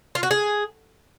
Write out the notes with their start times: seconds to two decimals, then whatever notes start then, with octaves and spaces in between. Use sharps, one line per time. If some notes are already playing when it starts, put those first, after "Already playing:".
0.15 F4
0.23 F#4
0.31 G#4